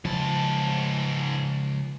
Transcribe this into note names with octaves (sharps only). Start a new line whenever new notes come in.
C#2 G#2 F3 A5